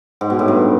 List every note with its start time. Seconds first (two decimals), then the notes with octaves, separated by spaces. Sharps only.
0.21 G#2
0.30 B2
0.39 A2
0.48 G2